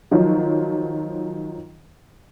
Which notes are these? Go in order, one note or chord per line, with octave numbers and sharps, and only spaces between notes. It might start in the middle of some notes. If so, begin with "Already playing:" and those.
D#3 F3 F#3